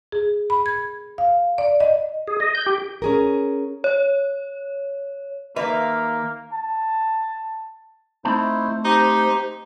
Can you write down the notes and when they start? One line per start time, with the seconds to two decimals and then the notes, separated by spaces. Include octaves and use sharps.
0.12 G#4
0.50 B5
0.66 G#6
1.18 F5
1.58 D5
1.80 D#5
2.27 G#4
2.40 D#5
2.55 G6
2.66 G4
3.02 C#4 G#4 A#4
3.84 C#5
5.56 D#2 B2 A#3 B4 E5 F5
6.53 A5
8.25 A3 C4 D#4 E4 C5 A5
8.85 D#4 G4 C5